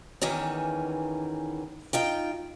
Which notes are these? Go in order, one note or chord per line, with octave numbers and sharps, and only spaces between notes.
E2 D#3 E3 C#4
D#4 F4 G5